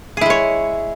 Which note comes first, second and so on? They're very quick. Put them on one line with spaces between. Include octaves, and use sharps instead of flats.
G#4 E4 G#3 C#5